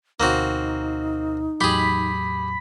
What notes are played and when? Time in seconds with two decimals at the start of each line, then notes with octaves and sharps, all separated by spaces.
0.20 D2 B2 A#3 C4 D#4 F#4
1.61 E2 A2 F#3 G4 G#4 B5